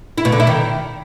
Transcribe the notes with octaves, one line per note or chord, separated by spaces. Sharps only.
E4
B2
D3
E4
D#3